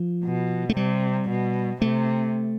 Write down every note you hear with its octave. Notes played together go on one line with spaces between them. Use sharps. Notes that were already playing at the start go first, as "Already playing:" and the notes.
Already playing: F3
B2
A3
C3 G3
B2
C3 A3